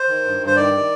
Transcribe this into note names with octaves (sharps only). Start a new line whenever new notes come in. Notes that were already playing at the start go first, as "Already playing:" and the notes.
Already playing: C5
D#3
G2
G2
C5
D#3 D5
D#3